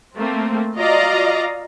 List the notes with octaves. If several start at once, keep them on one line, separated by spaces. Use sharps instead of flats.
A3 A#3 C4
F4 F#4 D5 D#5 F5 A#5